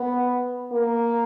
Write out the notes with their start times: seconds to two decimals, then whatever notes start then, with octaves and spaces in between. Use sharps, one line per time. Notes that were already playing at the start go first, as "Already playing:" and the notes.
Already playing: B3
0.72 A#3